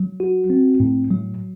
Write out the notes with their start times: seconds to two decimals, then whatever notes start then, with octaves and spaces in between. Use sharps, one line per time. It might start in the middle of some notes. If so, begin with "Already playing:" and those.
Already playing: F#3
0.20 F#4
0.50 C4
0.80 A2
1.10 F#3